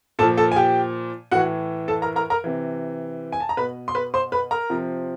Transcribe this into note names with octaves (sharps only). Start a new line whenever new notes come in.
A#2 F3 A4 A5
A4 A5
G#5
G4 G5
A2 E3 F#4 F#5
A4 A5
A#4 A#5
A#4 A#5
A#4 A#5
C3 E3
G#5
A5
A#5
B2 B4 B5
C6
B4 B5
C5 C6
B4 B5
A#4 A#5
C3 F3